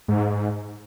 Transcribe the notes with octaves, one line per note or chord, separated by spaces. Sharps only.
G#2